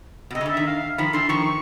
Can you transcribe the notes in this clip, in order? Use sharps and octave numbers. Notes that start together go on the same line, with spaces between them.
B2
C3 D#5
C#3
D3
E5
D#3
F5
D#3 F3 B5
D3 E3 C6
D#3 F3 C#6
C#6